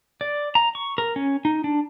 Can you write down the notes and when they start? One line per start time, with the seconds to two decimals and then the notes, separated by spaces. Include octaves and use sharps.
0.21 D5
0.55 A#5
0.75 C#6
0.98 A#4
1.16 C#4
1.45 D#4
1.64 D4